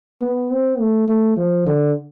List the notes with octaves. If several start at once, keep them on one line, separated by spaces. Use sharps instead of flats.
B3
C4
A3
A3
F3
D3